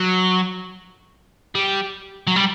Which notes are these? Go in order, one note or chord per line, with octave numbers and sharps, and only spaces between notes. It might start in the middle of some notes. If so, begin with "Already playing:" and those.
Already playing: F#3
G3
F#3
G3